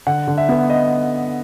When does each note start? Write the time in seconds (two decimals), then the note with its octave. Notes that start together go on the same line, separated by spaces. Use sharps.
0.07 D3 F#5
0.28 D3
0.38 E5
0.49 B3
0.70 D#5